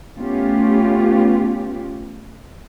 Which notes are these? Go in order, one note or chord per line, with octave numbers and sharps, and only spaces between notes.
A3 B3 C#4 F4 G4